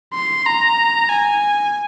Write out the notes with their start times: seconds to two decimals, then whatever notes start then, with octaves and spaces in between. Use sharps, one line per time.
0.14 C6
0.46 A#5
1.09 G#5